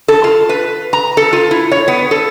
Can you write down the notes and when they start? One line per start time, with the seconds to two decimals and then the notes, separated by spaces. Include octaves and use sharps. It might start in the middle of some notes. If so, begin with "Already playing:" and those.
0.08 A4
0.24 F4
0.49 B4
0.93 A#5
1.17 A4
1.33 F4
1.51 E4
1.72 C#5
1.88 B3
2.11 A4